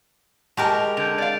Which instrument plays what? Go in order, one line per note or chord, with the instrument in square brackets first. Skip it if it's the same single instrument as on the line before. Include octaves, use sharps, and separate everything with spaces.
[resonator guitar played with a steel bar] A2 A5 A#5 [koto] G#3 G4 A#4
[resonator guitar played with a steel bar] D3 [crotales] G6 D7 F7
[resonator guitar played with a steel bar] D5 F5 [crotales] D7